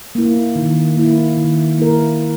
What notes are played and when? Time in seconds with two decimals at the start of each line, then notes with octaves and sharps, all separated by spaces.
0.15 A#3 E4
0.56 D#3
0.96 A#3 E4
1.37 D#3
1.78 A#3 E4 A#4
2.19 D#3